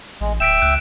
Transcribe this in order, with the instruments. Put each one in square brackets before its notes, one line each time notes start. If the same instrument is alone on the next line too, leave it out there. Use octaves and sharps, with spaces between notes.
[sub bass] A1 [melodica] G#3
[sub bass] D1 [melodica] E5 G5 [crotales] B6 D7 E7
[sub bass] C#2 [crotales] F#6